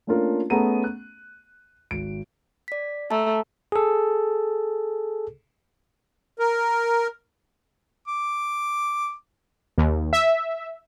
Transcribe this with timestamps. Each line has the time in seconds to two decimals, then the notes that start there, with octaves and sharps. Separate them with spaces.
0.07 A3 A#3 C#4 D4 F4 A#4
0.50 A3 B3 C#4 G#4 A#5 D#7
0.84 F#6
1.91 G#1 D7
2.68 D5 B6
3.11 A3 A5 A#5
3.72 G#4 A4
6.39 A#4
8.07 D6
9.78 D#2
10.13 E5